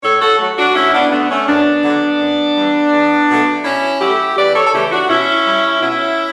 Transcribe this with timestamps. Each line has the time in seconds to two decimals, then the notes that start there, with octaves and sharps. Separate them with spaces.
0.03 A2 A4 C#5
0.22 F#4 A4
0.39 F#3 A3
0.58 D4 F#4
0.75 D2 C#4 E4
0.94 B3 D4
1.12 D3 A3 B3 D4
1.30 A3 C#4
1.48 F#2 B3 D4
1.84 D3 F#3
2.20 F#2
2.57 E3 G3
2.93 E2
3.29 B2 F#3 A3
3.65 B2 C#4 E4
4.01 F#3 A3 E4 G4
4.37 E2 B4 D5
4.55 A4 C#5
4.67 A4
4.74 C#3 E3 A3 E4 G4
4.92 D4 F#4
5.10 B2 C#4 E4
5.46 G3
5.82 B2 C#4 E4